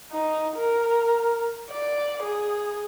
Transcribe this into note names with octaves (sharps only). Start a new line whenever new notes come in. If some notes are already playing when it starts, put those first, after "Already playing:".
D#4
A#4
D5
G#4